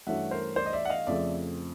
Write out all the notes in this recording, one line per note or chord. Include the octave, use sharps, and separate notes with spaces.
G2 E3 A3 C#4 F#4 E5 F#5
A#4 C5
C5 D5
D#5
D5 E5
F#5
D#5 F5
F2 C#3 F3 A3 D5 E5